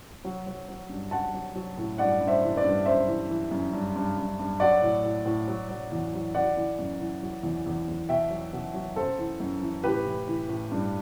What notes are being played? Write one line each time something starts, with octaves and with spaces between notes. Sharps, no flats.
F#3
F#3
F#3
G2
F#3 F#5 A5
F#3
F#3
A2
G2 D5 F#5
G2
C5 E5
E3
B4 D5
G2
F#2 C5 E5
E3
E3
F#2
G2
G2
G2
G2
F#3 D5 F#5
A2
A2
A2
F#3
F#3
E2
F#3
E3 D5 F#5
E3
F#2
E3
F#3
E2
E2
E2
B2 E5 G5
F#3
B2
F#3
F#2 A4 C5
E3
F#2
E3
A2 G4 B4
E3
E3
A2
G2